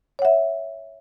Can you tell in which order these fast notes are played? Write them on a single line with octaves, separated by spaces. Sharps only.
C#5 F#5 E5